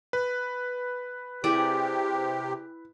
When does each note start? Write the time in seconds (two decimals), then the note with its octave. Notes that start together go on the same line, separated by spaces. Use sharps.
0.13 B4
1.44 C3 E4 G4 G#4 D5